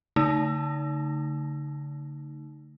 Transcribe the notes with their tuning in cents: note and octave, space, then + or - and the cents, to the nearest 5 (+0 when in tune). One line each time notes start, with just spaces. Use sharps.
D3 -35 A3 +25 D#4 +0